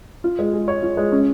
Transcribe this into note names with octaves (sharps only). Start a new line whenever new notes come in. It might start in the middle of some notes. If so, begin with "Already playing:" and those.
F4
G#3
G#4
C#5
F4
G#3
C#4